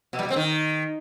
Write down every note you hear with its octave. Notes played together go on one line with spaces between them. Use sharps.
B2
G3
B2
C4
D#3